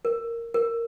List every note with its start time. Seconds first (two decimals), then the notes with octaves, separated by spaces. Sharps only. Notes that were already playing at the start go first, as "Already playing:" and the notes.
0.05 A#4
0.54 A#4